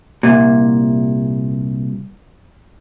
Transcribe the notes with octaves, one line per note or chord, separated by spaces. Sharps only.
C2 A#2